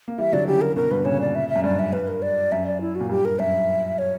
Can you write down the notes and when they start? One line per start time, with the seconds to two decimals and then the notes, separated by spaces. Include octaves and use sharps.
0.08 A#3
0.18 E3 G3 E5
0.33 D3 F#3 D5
0.47 C#3 E3 G4
0.61 A#4
0.76 B2 D3 A#4
0.90 G2 B2 B4
1.05 A#2 C#3 C#5
1.21 D5
1.35 E5
1.49 E5
1.56 F#2
1.64 G2 D5
1.79 E5
1.93 G2 B4
2.08 A#4
2.22 D5
2.52 F#2 E5
2.67 D5
2.81 E4
2.95 A#2 F#4
3.10 G2 G4
3.25 A#4
3.39 F#2 E5
3.98 C#5